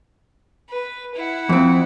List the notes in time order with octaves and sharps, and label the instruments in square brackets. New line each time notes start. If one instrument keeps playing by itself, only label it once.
[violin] B4
E4 F#5
[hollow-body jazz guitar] F2 C4